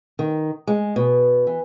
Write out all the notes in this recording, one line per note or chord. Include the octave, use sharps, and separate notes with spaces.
D#3
G#3
B2
E3